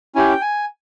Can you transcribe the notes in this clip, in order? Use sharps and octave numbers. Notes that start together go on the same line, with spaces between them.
C#4 E4 G4 G#5
G5
G#5